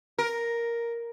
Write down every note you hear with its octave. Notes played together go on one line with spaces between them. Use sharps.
A#4